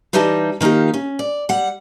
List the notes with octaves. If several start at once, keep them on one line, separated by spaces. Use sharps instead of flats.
E3 G3 D#4 G4 D#5 A5
D#3 A#3 D#4 F4 G4
C#4
D5
G3 F#5